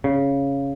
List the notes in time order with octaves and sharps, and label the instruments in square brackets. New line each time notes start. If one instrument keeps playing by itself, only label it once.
[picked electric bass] C#3